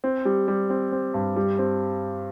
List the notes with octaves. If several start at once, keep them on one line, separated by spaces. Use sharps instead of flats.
C4
G3
G3
C4
C4
G2
G3
C4